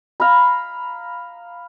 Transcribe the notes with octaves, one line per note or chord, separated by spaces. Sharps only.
F5 A#5 B5